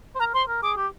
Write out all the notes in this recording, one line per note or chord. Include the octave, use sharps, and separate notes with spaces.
C5
A#4 A#5
C5 C6
A#4
G#4 D6
G4